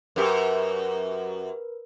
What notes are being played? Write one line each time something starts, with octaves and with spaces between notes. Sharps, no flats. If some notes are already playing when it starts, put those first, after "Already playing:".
F#2 G4 A#4 B4